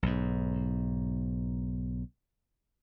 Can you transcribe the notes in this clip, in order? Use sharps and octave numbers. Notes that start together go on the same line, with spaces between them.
B1 G#2